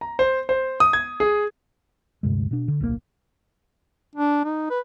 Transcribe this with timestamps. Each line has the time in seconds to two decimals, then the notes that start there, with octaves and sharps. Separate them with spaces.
0.01 A#5
0.19 C5
0.49 C5
0.80 D#6
0.93 G#6
1.20 G#4
2.23 D2 G2 C3 G#3
2.51 B2 D4
2.68 D3
2.80 D1 B1 C3 A#3
4.16 D4
4.45 D#4
4.70 B4